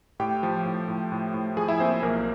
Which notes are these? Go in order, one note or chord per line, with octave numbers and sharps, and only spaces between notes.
A2 G4 G5
F3
A2
A2
A2
A2
F3 G#4 G#5
E4 E5
A#3 C4 C5
B1 A#3 A#4